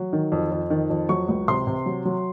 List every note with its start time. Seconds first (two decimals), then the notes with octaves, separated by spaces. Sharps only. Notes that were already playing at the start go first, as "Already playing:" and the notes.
Already playing: F#3
0.13 D#3
0.32 F2
0.51 F2
0.70 D#3
0.90 F2
1.09 F#3 C#6
1.28 C#2
1.48 C3 C6
1.67 C3
1.86 F#3
2.05 F#3